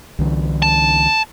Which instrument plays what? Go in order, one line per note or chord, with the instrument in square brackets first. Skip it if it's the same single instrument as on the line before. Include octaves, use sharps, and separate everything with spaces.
[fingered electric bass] C2 D3 E3
[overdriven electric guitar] A5